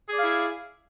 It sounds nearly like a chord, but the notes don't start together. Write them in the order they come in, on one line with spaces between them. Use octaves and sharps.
G#4 D5 F5 E4